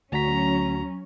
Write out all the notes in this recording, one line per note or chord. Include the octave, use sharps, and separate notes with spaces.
D2 F#3 C#4 F#4 A#5 B6